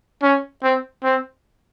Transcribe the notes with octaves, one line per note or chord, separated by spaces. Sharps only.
C#4
C4
C4